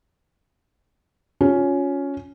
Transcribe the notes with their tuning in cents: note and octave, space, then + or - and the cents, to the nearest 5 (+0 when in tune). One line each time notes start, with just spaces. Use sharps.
C#4 +10 F4 +30